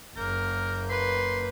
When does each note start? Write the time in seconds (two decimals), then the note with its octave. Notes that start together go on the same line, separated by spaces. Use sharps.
0.16 F#1 A#3 A#4 G6
0.90 B4 C6